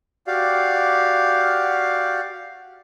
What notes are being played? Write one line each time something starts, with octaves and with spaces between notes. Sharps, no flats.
F#4 G4 D5 F5